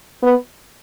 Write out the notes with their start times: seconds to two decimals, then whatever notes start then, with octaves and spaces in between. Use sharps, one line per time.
0.23 B3